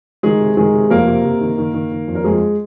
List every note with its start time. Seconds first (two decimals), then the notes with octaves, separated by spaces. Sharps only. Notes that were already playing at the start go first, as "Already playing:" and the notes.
0.23 D#3 G#3 G#4
0.40 C3
0.57 D#3 G#3 G#4
0.74 C3
0.90 F2 A#3 A#4
1.07 C3
1.24 C3
1.41 D#3
1.58 D#3
1.74 D#3
1.92 D#3
2.08 F2
2.15 A#4
2.24 F2 G#3 G#4